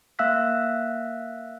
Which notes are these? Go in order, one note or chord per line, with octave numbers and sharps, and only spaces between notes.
A#3 E5 F5 E6 F#6 B6